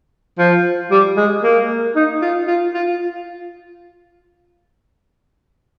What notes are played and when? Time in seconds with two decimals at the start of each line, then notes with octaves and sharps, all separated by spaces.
0.39 F3
0.91 G3
1.17 G#3
1.43 A#3
1.96 D#4
2.22 F4
2.48 F4
2.75 F4